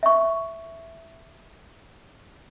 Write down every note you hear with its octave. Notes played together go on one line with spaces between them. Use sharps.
E5 C#6